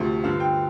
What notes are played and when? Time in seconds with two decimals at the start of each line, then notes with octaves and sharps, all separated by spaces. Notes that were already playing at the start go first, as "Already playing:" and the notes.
Already playing: D2 C3 F3 A3
0.24 G2 D3 F3 F5
0.40 G5